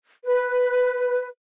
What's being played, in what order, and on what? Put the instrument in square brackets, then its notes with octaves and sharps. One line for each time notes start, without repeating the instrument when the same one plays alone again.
[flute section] B4